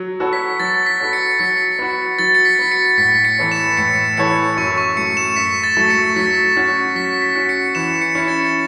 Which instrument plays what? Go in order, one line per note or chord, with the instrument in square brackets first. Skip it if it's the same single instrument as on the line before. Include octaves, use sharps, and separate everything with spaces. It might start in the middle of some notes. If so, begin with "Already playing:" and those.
Already playing: [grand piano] F#3
B3 F#4 A4 C#5
[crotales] B6
[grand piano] F#3 [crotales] A6
[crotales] B6
[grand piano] B3 F#4 A4 C#5
[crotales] C#7
[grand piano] F#3 [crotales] B6
[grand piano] B3 F#4
[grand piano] F#3 [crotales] A6
[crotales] C#7
B6
[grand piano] B3 F#4
[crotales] C#7
[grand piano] A2 [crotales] B6
[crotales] C#7
[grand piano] E3 B3 A4 C#5
[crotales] E7
[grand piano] A2 [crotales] C#7
[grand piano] E3 B3 A4 C#5 [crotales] C#7
[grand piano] F#2 [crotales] C#6
[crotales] C#6
[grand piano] F#3 A3 [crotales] C#7
[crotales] E7
[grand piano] F#2 [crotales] B6
[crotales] A6
[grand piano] F#3 A3
[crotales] C#7
[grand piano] F#3 [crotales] B6
[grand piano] C#4 F#4
[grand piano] F#3 [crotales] B6
[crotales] B6
[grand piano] C#4 F#4
[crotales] C#7
[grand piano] E3 [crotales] E7
[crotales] C#7
[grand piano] C#4 E4
[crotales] A6